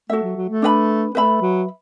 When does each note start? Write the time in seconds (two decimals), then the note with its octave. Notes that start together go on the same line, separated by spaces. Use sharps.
0.10 A3 F#4 A4 E5
0.23 F#3
0.36 F#3
0.49 A3
0.62 D4 B4 E5 B5
1.15 A3 B4 E5 B5
1.41 F#3